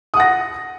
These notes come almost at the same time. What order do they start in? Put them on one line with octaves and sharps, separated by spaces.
D#6 F#5 A#6